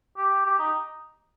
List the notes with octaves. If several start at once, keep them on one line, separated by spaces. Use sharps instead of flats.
G4
G4
D#4